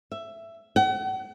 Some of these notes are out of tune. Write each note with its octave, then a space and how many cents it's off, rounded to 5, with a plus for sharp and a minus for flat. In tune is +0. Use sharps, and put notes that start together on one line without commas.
E5 +15
F#5 +40